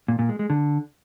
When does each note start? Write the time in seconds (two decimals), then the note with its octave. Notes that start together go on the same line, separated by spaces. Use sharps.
0.08 A#2
0.19 A#2
0.29 G#3
0.39 G#3
0.50 D3